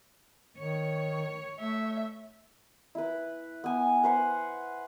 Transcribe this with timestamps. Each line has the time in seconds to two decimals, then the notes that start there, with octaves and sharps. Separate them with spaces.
0.57 D#3 C#5
1.60 A3 E5
2.95 E4 B4
3.64 B3 G#5
4.04 B4 C5 F#5